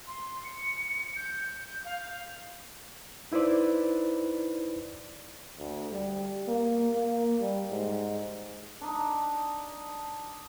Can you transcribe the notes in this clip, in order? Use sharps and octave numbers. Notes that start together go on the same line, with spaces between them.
C6
C#7
G6
F5
D#4 E4 B4 C5 D5
D2
G3
A#3
A#3
G3
G#2
D4 D#4